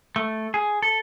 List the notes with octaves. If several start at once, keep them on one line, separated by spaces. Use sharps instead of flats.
A3
G#4
A4